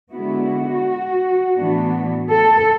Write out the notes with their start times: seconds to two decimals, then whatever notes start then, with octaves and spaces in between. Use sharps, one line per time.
0.12 D3 G#3 B3 E4 F#4
1.58 A2 E3 B3 D4
2.31 A4